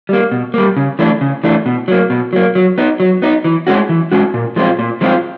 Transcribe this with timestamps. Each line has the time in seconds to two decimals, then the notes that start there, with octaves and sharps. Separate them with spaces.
0.09 G3 A#3
0.32 B2
0.54 G3 A#3
0.76 C#3
0.99 E3 A3 D4
1.21 C#3
1.43 E3 A3 D4
1.66 B2
1.88 F#3 A#3
2.10 B2
2.33 F#3 A#3
2.55 F#3
2.78 B3 D#4
3.00 F#3
3.22 B3 D#4
3.44 E3
3.67 G#3 C#4 F#4
3.89 E3
4.12 G#3 C#4 F#4
4.34 A#2
4.56 F3 G#3 C4 F4
4.79 A#2
5.01 F3 G#3 C4 F4